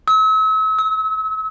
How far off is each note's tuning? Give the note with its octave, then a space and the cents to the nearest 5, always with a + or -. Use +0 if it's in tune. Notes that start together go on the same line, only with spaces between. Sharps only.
E6 -40
E6 -20